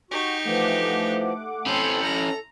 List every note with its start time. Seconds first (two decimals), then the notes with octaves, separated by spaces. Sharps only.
0.11 D#4 F#4 G4
0.45 E3 F3 A3 F#5 D6
1.66 C4 C#4 E4 A4 C6 G6 C#7
2.03 A4 A#5